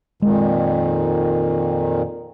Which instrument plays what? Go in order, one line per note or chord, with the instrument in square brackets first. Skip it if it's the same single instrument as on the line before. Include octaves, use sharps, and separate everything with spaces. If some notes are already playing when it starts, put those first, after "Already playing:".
[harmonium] F2 A#2 D#3 [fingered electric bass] G#3